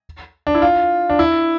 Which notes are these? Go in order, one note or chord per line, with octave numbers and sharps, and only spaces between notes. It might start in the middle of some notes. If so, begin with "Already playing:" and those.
D4
E4
F4
D4
E4